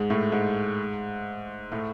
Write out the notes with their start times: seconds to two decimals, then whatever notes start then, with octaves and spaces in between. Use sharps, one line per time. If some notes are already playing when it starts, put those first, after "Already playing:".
Already playing: G#2 G#3
0.10 A2 A3
0.32 G#2 G#3
1.72 A2 A3